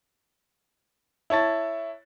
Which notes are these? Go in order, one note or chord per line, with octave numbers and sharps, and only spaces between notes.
E4 C#5 A5 A6